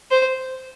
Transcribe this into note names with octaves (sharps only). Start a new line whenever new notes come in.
C5